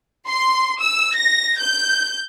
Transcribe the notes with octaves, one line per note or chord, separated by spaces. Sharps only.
C6
E6
A#6
G6